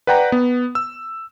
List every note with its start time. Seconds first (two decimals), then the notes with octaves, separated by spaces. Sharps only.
0.07 B4 D5 F#5 G5 A#5
0.32 B3
0.75 E6